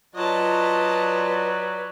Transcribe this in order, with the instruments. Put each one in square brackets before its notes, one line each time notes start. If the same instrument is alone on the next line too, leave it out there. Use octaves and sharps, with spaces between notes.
[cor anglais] F#3 [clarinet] F4 [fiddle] B4 D5 [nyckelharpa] D#5 A5